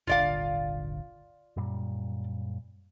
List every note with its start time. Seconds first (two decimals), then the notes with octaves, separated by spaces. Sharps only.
0.07 D#1 G#1 D3 F4 D5 F5
1.57 F#2 A#2 G3